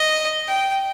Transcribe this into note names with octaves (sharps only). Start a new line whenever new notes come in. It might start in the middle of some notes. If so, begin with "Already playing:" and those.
Already playing: D#5
G5